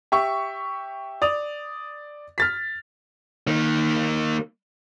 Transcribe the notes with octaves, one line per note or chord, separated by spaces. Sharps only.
G4 E5 C#6
D5 D#6 F7
F6 A6 B6
D#3 A#3